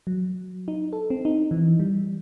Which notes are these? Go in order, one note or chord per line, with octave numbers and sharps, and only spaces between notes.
F#3
D#4
A4
C4
D#4
E3
G3